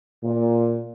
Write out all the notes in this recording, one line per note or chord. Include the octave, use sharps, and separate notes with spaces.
A#2